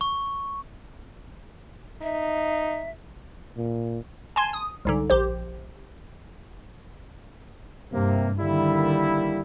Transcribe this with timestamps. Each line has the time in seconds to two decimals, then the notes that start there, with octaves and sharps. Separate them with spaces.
0.01 C#6
2.02 D#4 E5
3.57 A#2
4.36 G#5 A5 C6 G#6
4.53 D#6
4.85 C2 G#2 D3
5.10 A#1 G4 C5
7.92 G2 C3 A#3
8.39 D3 D#3 G3 A#3 E4